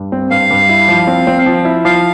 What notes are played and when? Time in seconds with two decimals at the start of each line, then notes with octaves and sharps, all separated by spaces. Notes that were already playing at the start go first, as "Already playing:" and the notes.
Already playing: G2
0.12 C4
0.31 G2 F5
0.50 G2
0.69 E4
0.88 F3
1.07 C4
1.27 C4
1.46 F3
1.65 E4
1.85 F3 F5